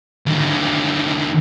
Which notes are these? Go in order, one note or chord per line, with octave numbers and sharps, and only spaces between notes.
D#2 D3